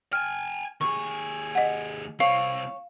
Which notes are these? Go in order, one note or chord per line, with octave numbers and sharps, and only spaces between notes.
G5 G#5 F6
D#2 G#4 C#6
D#5 F#5
C2 C4 C#5 F5